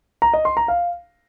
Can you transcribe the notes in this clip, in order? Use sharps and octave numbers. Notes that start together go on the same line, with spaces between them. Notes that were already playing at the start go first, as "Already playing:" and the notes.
A#5
D#5
C6
A#5
F5